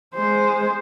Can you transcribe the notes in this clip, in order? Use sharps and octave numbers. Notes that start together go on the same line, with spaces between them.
G#3 C5